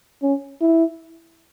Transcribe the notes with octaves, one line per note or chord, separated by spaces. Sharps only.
C#4
E4